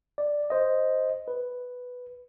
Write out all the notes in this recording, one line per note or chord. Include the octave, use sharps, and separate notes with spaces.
D5
C5 D#5
B4